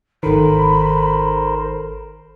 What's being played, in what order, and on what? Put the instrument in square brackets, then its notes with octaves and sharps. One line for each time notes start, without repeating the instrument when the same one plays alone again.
[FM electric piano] G#1 D#3 [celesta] A4 [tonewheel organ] A#4 C5 [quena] B5